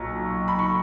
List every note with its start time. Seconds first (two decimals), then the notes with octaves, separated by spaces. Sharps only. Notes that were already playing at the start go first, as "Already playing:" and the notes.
Already playing: B1 A#2 C#6
0.48 B5
0.59 C#6